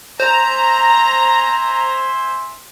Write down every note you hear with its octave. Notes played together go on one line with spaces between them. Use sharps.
C5 E5 G#5 A#5 C6